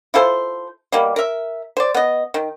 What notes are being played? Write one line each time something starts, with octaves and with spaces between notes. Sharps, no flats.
E4 F4 A4 C5
B2 G3 A#3
A#4 E5
C5 D5
B3 D#5
D#3